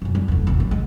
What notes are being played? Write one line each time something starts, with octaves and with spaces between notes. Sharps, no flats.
E1 F#2
G3
F1 E2
A1 E2
F#2
G#3